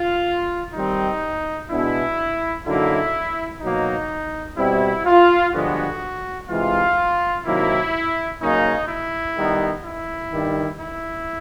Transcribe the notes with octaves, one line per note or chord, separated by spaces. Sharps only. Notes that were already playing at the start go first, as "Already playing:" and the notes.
Already playing: F4
D#3 G3 C4 D#4
B2 G#3 B3 D4 E4
F#2 D3 F#3 A#3 D#4 E4
B2 F#3 A#3 D#4
B2 G3 C4 E4
F4
G2 D3 F3 G#3 B3 F#4
C3 E3 G#3 F4
C3 D#3 F#3 A#3 E4
C#3 F#3 A#3 C#4 D#4
E4
D#3 G3 B3 D#4
E4
G2 D#3 G3
E4